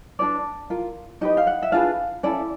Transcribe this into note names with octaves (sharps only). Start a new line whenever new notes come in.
D4 G4 B4 D5
F4 A#4
D#4 G4 B4 D#5
F5
F#5
E5
D4 F4 G#4 B4 F5
C#4 E4 A4 D5